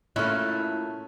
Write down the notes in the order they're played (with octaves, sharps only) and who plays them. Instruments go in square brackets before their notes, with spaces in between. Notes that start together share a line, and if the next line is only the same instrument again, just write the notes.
[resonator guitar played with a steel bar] A#2 A3 [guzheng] C#4 [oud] E4 [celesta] F#6